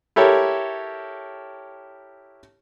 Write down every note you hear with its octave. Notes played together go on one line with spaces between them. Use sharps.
E4 G4 A4 A#4 C#5